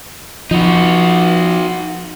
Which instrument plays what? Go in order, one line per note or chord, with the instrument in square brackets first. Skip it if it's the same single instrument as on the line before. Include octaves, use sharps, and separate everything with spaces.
[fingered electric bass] F3 [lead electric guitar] D#4 F#4